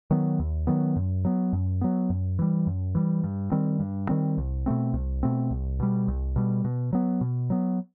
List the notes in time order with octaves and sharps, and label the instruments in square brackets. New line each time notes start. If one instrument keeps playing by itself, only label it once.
[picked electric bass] D#3 F#3 B3
D#2
D#3 F#3 B3
F#2
F#3 B3
F#2
F#3 B3
F#2
E3 G3
F#2
E3 G3
G2
D#3 G3 C4
G2
D#3 G3 C4
C2
B2 A3 C4
C2
B2 A3 C4
C2
B2 G3
C2
B2 G3
B2
F#3 B3
B2
F#3 B3